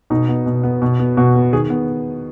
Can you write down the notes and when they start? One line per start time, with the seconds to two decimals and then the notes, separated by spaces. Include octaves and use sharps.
0.10 B2 D#4
0.28 B3
0.46 B2
0.63 B3
0.82 B2
0.99 B3
1.17 B2 F#4
1.35 B3
1.52 D#3 G#4
1.70 B3